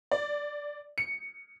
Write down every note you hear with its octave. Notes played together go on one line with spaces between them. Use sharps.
D5
C#7